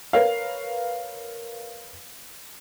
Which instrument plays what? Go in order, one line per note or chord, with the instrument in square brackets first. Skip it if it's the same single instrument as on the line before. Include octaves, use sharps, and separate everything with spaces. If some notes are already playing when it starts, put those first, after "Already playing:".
[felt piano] A#4 B4 C#5 F5